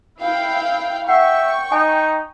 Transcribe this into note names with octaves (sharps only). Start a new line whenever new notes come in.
E4 F5 G5
E5 F#5 G5 C#6
D#4 G#5